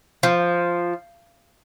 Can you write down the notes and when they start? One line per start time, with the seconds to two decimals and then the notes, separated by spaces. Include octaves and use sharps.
0.23 F3